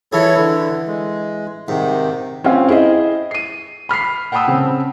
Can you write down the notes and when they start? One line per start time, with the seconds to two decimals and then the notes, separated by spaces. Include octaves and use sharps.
0.13 E3 E4 G#4 A4 C#5
0.37 D3
0.87 G#3
1.68 G#2 C3 D#3
2.44 C4 C#4 F4 F5
2.69 E4 G#4 C5 D#5
3.31 C7 D#7
3.89 B5 F6 B6 C7
4.32 F#5 G5 A5 B5 D#6 E6
4.48 C#3 C4